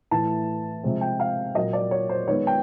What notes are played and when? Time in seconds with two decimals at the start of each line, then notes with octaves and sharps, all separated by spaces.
0.11 A2 E3 A3 A5
0.83 C3 F3 G#3 C4
1.01 G5
1.20 F5
1.55 A#2 F#3 A#3 D#5
1.73 D5
1.91 C#5
2.09 C5
2.28 D#3 G#3 B3 C#5
2.47 G5